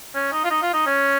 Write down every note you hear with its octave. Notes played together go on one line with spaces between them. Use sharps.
C#4
D#4
F4
D#4
F4
D#4
C#4